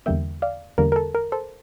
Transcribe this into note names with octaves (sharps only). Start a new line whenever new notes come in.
E2 D3 G3 A#3 E5 G5
D5 F5
E2 D3 G3 A#3 A#4
A#4
A4
A#4
A4 C5